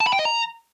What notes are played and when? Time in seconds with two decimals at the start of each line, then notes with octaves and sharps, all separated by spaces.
0.01 A5
0.07 B5
0.13 G5
0.19 D#5
0.25 A#5